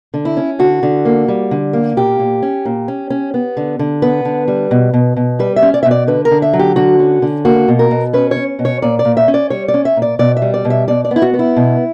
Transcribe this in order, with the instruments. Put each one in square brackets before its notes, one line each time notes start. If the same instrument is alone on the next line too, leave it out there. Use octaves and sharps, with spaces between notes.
[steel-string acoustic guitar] D3
E4
C#4
D3 F#4
D3
A#3
G3
D3
A#3
A#2 G4
A#2
C#4
A#2
C#4
C#4
B3
D3
D3
B3 B4
D3
G3
B2
B2
B2
G3 B4
E5
C#4
D5
E5
B2
D5
D3 B4
A#4
D3
E5
F#3
G4
D3 F#4
C#4
D3
A#3 F#4
B2
A#4
B2
C#4 B4
C#5
C#4
B2
C#5
A#2 D5
D5
A#2
E5
C#4
D5
G3 C#5
D5
C#4
E5
A#2
D5
B2 D5
E5
G3
D5
B2
E5
B2 D5
D5
B3
E4
F#4
B3
E4
B2